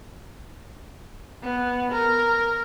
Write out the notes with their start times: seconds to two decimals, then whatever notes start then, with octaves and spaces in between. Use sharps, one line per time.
1.43 B3
1.91 A#4